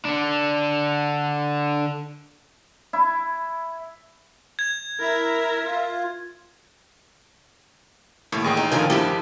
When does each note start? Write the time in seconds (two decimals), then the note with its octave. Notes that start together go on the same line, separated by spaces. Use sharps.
0.05 D3 D4
2.93 E4
4.59 G#6
5.00 E4 A#4 E5 A#5
5.65 F4
8.32 D#2 A2
8.44 A1 G#4 G5
8.57 D#4
8.72 A#2 D3 D#3 F3 G#5
8.90 G1 A2 D3 D4 G4